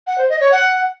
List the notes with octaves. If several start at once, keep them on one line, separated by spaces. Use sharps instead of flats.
F#5
C5
D#5
C#5
F#5